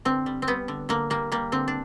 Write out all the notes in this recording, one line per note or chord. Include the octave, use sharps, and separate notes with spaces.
D3 C4
G3
C4
G3 B3
D3
D3 A#3
G3 A#3
G3 A#3
D3 C4
D4